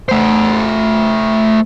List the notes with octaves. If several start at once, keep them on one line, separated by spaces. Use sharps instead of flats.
A3 C5